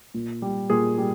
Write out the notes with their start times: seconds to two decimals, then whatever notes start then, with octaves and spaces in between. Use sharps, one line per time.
0.14 A#2
0.42 G3
0.70 A#2 G#4
0.98 G3